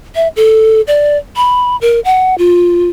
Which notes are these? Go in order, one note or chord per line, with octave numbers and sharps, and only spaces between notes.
E5
A4
D5
B5
A#4
F#5
F4